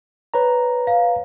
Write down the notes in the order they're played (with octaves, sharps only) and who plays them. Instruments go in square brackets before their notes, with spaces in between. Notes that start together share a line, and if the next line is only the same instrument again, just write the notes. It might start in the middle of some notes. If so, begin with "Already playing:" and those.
[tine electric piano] B4 C#5 A#5
[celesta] F5